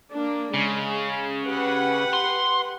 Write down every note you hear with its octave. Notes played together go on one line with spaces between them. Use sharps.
A#3 D4
C#3 G#3
G4 B4 F#5
C6